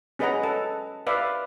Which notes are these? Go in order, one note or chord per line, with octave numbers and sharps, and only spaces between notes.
C#4 G#4 B4 D#5 F#5 A#5
A4
B4 D5 E5 F5